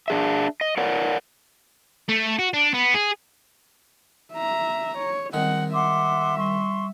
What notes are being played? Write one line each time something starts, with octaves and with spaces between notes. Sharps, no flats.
D4 G#4 E5
D#5
A#4 C#5 D5 F#5
A3
F#4
D4
B3
G#4
E5 A#5
C#5
D#3 G3 G#3 C4 G#4 F#5
E5 F#5 C6 D6
G3 C6 C#6